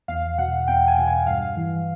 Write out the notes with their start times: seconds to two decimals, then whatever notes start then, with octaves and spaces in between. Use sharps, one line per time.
0.08 E2 F5
0.38 B2 F#5
0.68 E2 G5
0.88 G#5
0.98 B2
1.08 G#5
1.27 G2 F5
1.56 E3